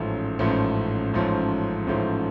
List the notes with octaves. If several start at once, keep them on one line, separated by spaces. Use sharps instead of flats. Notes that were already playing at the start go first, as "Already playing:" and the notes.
Already playing: A1 G#2 F3 A3 C#4
A1 G#2 F3 A3 C#4
A1 G#2 F3 A3 C#4
A1 G#2 F3 A3 C#4